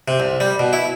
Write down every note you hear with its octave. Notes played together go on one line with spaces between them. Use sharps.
C3
C2
G3
B2
E4